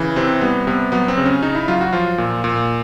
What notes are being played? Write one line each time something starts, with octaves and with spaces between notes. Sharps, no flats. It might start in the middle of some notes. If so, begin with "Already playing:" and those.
Already playing: C#3 E3
C3 C4
G3 B3
C3 B3
F#3 B3
C4
C#3
C#4
C#3 D#4
E4
F#3 F4
F#4
F3 F4
A#2
A#2